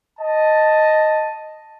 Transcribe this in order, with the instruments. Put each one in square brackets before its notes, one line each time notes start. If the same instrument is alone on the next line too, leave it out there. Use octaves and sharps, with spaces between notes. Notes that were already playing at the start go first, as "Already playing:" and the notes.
[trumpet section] D#5 A5